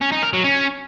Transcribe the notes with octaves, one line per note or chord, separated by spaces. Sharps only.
C#4
D#4
A#4
F#3
C#4